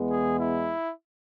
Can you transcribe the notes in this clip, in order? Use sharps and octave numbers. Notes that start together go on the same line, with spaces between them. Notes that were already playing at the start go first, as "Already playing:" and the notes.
Already playing: E2 E3 G#3 B3
G#4
E4